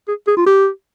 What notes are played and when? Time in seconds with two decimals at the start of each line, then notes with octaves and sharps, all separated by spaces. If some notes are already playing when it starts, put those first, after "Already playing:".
0.08 G#4
0.28 G#4
0.38 F4
0.46 G4